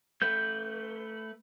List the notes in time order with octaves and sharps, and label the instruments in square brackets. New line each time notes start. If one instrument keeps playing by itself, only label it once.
[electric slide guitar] A3 B4 [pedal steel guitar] G6